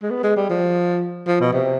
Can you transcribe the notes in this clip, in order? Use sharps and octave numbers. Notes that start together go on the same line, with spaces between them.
G#3
B3
G#3
G3
F3
F3
B2
C3